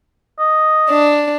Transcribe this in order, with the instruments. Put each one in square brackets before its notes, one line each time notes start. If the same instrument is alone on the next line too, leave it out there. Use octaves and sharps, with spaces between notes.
[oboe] D#5
[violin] D4